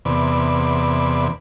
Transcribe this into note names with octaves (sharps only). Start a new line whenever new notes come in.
E2 C3 B3 D5